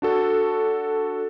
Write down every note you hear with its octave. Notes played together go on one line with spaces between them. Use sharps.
D4 F#4 A4